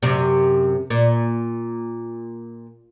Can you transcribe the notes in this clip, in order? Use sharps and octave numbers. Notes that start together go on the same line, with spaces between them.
F#2 C3
A#2